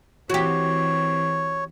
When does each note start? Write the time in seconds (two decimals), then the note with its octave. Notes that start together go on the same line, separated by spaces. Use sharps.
0.30 E3 C4 F#4 G4 C#5